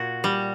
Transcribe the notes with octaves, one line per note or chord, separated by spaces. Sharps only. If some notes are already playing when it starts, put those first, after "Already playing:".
Already playing: A#2 F#4
G3